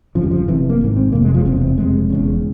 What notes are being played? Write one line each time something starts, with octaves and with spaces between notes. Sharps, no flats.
G1 F2 C#3 F3
G3
F3
F1 F2 C3 E3
A#3
G#1 G#2
C4
F1 F2 C3 A#3
G#3
F3
E1 E2 C3 C4
C4
F1 F2 C3 G#3
E1 E2 C#3